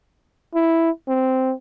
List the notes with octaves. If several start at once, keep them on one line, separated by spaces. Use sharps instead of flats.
E4
C4